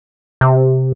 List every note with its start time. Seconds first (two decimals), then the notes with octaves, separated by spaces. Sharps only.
0.41 C3